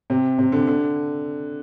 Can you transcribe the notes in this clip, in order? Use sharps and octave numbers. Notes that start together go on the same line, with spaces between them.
C3
C3
D3
D3